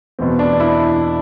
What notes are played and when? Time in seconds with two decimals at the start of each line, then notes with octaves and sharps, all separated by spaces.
0.19 E2 B2 C4
0.39 D4
0.60 E4